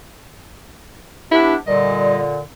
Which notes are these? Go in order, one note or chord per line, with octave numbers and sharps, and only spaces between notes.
B3 D4 E4 G4
A#2 D3 G3 D#5